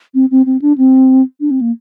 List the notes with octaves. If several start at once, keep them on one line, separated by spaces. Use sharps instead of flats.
C4
C4
C4
D4
C4
D4
C4
A#3